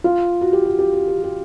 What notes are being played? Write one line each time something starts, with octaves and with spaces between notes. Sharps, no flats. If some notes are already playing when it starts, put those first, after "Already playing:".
F4
F#4
G4
F#4
G4
G4
G4
G4